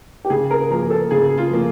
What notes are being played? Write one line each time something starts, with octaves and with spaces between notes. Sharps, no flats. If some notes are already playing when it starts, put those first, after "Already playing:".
G4
C#3 G#4
A#4
F3 A#3 A#4
A4
C#3 G#4
F4
F3 A#3